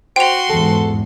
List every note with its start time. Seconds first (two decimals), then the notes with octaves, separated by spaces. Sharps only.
0.16 F#4 C5 G5 C6 F7
0.50 E2 G#2 A4